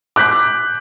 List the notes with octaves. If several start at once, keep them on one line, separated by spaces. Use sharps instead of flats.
D6 F#6 G6 B6